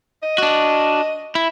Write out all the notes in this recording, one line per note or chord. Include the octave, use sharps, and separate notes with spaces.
D#5
D4 F#4
E4